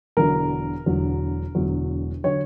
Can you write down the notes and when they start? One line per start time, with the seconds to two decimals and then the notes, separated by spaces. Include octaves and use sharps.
0.17 E1 E2 D3 F#3 A#4
0.86 E1 E2 D3 F#3
1.55 E1 E2 D3 F#3
2.24 D3 F#3 C#5